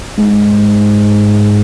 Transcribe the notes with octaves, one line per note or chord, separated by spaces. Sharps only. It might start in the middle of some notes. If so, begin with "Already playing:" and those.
G#2